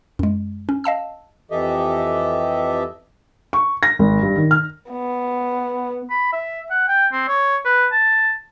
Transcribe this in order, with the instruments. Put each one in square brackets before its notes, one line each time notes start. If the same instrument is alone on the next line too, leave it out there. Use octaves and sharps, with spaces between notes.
[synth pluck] F#2 G#3
C#4
D#5 F5 A5 E6
[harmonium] F2 E3 G4 A4 D#5 E5
[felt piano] C#6
A#6
G#1
G2
D#3
F6
[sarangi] B3
[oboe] B5
E5
F#5
G5
C4
C#5
B4
A5